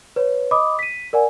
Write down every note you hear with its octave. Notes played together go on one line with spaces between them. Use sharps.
B4 C#5
D#5 B5 D6 D#6
B6 D#7
A#4 D5 F#5 G#5